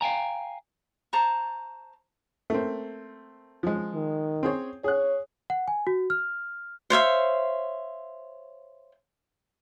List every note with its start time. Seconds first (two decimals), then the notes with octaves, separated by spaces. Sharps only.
0.01 F5 G5 G#5 A#5
1.13 C5 A5 A#5 C#6
2.50 A3 A#3 C4
3.63 F3 G#3
3.94 D#3
4.43 C4 G#4 C#5
4.84 G#4 C#5 F#6
5.50 F#5
5.68 G#5
5.87 F#4
6.10 F6
6.90 C5 C#5 E5 F5